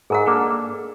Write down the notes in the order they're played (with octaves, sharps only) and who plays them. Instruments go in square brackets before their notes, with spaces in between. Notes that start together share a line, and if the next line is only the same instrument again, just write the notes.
[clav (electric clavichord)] G#2 [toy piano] G#4 A#4 F#5
[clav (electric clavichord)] A#3 D4 A4